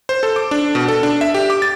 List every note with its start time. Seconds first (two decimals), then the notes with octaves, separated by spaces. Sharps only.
0.09 C5
0.23 A4
0.36 D6
0.51 D4
0.75 B2
0.88 A4
1.03 D4
1.21 E5
1.35 G4
1.50 D6
1.62 A6